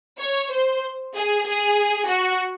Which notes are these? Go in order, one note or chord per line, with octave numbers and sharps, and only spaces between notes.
C#5
C5
G#4
G#4
F#4